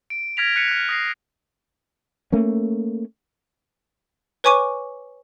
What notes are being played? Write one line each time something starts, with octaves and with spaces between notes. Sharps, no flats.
D7
F6 G#6 A#6 B6 D7 F7
F#6 B6 C#7 D#7
F6 F#6
D#6 A#6 C7
A3 A#3 C#4
B4 C#5 G#5 C#6 D6 D#7